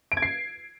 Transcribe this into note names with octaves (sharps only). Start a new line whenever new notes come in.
D7
G#6
C7